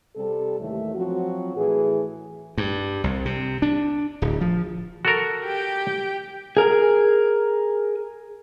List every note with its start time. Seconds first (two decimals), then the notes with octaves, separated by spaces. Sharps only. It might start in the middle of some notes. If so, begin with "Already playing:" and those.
0.16 C3 G3 C4 A4
0.59 D#2 A2 E3 A3
0.94 F3 F#3 C4 F#4
1.55 A2 E3 G#4
2.58 G2
3.04 C2
3.25 C3
3.62 D4
4.22 D1
4.41 F3
5.05 F#4 A4 A#4
5.43 G4 G5
6.57 G#4 A#4